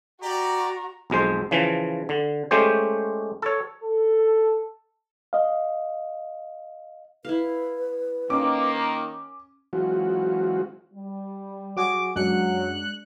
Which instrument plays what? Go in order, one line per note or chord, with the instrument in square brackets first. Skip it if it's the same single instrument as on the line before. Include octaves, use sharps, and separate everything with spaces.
[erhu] F#4 [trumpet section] G4 D5 [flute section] A#5
[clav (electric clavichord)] B1 F2 G#3 C5
C#3 E3 F3
D3
G#3 A3 C#4 G4 C5
A4 C#5
[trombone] A4
[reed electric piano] D#5 F5
[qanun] E4 F5 [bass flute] B4
[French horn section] D#3 A#3 [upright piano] C#4 D6
[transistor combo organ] E3 F#3 G#3 C4 F4 F#4
[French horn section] G3
[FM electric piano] F#3 F#4 G#4 [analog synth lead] D6
[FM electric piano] F#2 [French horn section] F#3 [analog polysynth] G#3 D4 C#7 [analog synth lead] F#6